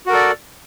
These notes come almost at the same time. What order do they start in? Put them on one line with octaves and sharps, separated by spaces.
F#4 A#4 A4 D5